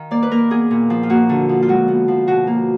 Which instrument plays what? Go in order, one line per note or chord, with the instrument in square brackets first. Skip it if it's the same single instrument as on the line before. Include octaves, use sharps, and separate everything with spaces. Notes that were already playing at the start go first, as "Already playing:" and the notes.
Already playing: [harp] D#3 F5
A#3 D5
B4
A#3 A#4
B3 G#4
A#2
F3
F4
A#3 F#4
D3
F3
F4
G#3 F#4
B3
F3
B2 F#4
A#3